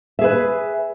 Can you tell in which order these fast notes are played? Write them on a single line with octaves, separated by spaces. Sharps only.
E5 G#4 B4